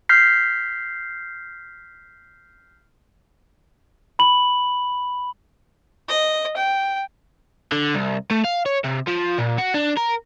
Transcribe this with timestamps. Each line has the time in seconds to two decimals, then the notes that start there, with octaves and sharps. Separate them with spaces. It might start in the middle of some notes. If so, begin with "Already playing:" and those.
0.09 F6 G6 B6 C7
4.19 B5 F#7
6.08 D#5
6.57 G5
7.72 D3
7.95 C2
8.31 A3
8.44 F5
8.66 C#5
8.84 C3
9.08 F3
9.39 A#2
9.58 F#4
9.74 D4
9.97 A#4